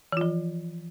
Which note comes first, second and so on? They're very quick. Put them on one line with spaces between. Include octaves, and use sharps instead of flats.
E3 F4 F3